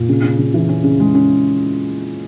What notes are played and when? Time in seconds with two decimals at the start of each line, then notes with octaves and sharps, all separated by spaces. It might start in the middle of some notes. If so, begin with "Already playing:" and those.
Already playing: A#2
0.09 C#3
0.23 C#3
0.38 C#3
0.54 E3
0.69 C#4
0.84 C#3
1.00 G#3
1.15 C#4